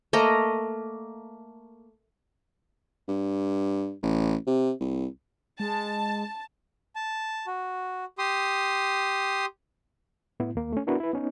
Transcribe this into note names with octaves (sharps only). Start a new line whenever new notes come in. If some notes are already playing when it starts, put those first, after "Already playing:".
A3 A#3 D#5 A#5
G2
A1
C3
C2
G#3 A5
A5
F#4
G4 C6 D#6
A2 B3 E4
D#2 A#3
A3 C#4
B3 D4 E4 F#4 A#4 B4
E4 B4
B3 C#4 D#4